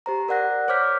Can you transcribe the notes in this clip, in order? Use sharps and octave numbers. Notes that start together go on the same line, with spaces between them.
G4 C5 A#5
A#4 D5 F#5 F#6 A#6
C5 C#5 D6 F6 G6 B6